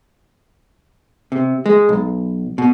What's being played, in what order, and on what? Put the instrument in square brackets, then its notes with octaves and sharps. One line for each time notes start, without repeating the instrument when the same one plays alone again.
[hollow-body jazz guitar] C3
G#3
B1
B2